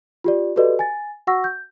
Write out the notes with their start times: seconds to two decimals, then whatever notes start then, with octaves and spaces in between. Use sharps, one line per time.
0.24 F4 G4 D5
0.56 F#4 G4 A4 B4 D5 D#5
0.79 G#5 A6
1.27 F#4 F#5 C#6 E6 A#6
1.44 G6